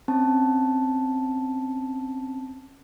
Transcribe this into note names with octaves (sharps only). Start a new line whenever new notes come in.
C4 C#4 A5